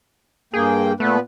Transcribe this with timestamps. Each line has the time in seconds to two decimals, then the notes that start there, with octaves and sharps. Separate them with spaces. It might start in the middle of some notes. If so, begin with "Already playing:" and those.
0.54 G2 A#3 G#4 G5
1.00 A#2 A3 B3 B4